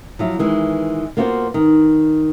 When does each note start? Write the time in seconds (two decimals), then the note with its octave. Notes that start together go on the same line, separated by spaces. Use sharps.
0.19 F3 F#3 E4
0.39 D#3 E3 G#3
1.17 A#3 B3 F4 F#4 B4 C5
1.54 D#3